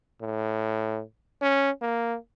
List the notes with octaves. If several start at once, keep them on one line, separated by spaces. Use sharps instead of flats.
A2
C#4
A#3